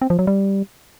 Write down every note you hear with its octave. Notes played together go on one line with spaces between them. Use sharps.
C4
F3
F#3
G3